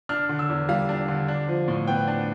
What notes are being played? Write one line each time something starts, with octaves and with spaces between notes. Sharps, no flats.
D4 F6
D3
E6
E2
G3 F5
D4
D3
D4
F3
A2
B3 G5
D4